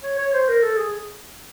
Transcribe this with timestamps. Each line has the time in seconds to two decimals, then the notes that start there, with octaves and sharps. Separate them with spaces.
0.03 C#5
0.18 C#5
0.33 C5
0.48 A#4
0.63 A4
0.77 G#4